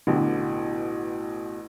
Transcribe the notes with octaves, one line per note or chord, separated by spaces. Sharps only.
A1 B2 D3